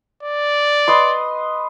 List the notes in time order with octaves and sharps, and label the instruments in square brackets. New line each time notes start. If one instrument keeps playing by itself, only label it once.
[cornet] D5
[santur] B4 D#5 C6